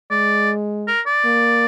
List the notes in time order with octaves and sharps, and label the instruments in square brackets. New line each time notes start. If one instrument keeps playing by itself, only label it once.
[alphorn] G#3 [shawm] D5
[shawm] A#4
D5
[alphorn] A#3